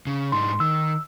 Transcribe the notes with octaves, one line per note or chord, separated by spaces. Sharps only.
C#3
G#2 D4 D#4 C6
D#3 E6